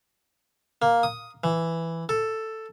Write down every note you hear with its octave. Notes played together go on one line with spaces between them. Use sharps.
A#3
D#6
E3
A4